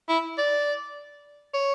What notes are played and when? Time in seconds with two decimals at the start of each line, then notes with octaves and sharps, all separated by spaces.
0.09 E4
0.38 D5
1.54 C#5